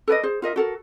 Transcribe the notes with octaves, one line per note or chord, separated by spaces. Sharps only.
A4 B4 D5 D#5
G#4 C5
F4 A#4 D#5 E5
F#4 A4 A#4